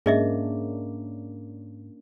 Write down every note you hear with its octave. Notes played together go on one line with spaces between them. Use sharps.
G#2 A#3 C#4 D4 G#4 D#5 E5